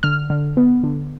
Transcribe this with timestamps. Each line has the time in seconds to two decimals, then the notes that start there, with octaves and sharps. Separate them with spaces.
0.03 D3 F6
0.30 D3
0.57 B3
0.84 D3